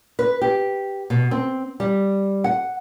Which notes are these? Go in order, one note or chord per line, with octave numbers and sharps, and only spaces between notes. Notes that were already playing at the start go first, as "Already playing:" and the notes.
B4
G4
B2
C4
G3
F#5